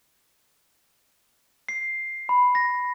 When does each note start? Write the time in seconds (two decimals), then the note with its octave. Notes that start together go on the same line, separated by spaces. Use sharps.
1.69 C7
2.29 B5
2.55 A#6